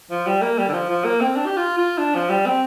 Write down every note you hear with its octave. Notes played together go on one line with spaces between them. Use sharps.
F3
G3
A#3
G3
D3
F3
F3
A#3
C4
D4
G4
F4
F4
D4
F3
G3
C4